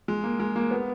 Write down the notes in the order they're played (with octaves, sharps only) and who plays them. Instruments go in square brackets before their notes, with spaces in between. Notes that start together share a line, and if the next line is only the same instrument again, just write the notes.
[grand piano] G#3
A#3
G#3
A#3
B3